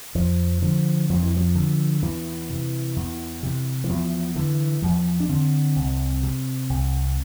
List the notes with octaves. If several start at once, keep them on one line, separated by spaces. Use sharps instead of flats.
F2 F3
D3 F3
F2 F3
E3
F3
D3
E2 E3
C3
E2
C3
E3
E2 F3
D3 E3
E2 F3
D4
D3 C4
C2
C3
C2